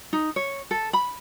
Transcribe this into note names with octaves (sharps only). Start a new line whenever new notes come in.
D#4
C#5
A4
B5